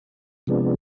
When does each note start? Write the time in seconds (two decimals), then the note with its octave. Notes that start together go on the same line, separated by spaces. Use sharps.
0.47 C3 F3 G#3 B3 D4